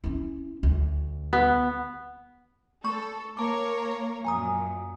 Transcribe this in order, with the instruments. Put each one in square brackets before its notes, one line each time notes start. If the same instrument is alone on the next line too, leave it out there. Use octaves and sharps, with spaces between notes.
[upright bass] C#4 E4
D2
[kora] B3
[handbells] A3 C#6 [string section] A4
[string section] A#3 A#4 C#5 [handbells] A5 D6
[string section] F#2 A#2 [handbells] G#5 A#5 D#6